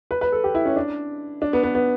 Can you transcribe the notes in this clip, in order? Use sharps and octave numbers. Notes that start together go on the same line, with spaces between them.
B4
B4
A4
G4
E4
C#4
D4
D4
B3
B3
B3